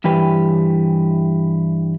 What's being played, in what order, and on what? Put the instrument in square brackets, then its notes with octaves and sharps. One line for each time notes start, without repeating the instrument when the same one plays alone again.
[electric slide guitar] G2 E3 G4 B4